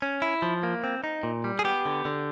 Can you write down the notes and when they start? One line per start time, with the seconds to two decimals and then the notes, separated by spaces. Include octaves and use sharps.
0.02 C#4
0.22 E4
0.42 F3
0.63 A#3
0.84 C4
1.04 D#4
1.23 A#2
1.44 G3
1.59 G#4
1.64 B3 G4
1.86 D3
2.05 D3